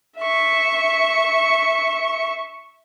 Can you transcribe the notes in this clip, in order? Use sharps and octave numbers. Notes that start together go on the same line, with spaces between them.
E5 C#6